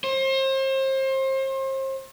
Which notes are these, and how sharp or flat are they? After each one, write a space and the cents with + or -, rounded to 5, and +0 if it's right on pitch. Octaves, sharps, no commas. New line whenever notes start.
C5 +35